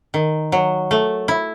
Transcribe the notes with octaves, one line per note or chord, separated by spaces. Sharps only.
D#3
F#3
A3
E4